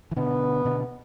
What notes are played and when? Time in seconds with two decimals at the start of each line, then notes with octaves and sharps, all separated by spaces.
0.11 E3
0.16 B2 D3 B3
0.65 B2 D3